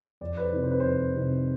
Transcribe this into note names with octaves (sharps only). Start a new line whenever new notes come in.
F2 D5
B4
C5
C3 D#3
C5
B4
F2 C5
C3 D#3